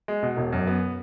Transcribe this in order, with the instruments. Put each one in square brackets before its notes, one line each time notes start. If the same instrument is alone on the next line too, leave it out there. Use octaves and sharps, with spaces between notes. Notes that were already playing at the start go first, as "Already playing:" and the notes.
[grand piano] G#3
B2
E1
F#2
B3